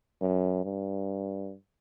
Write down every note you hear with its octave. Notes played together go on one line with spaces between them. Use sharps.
F#2
G2